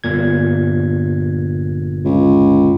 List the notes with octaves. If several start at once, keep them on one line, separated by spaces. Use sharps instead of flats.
G1 A#2 G#6
C#2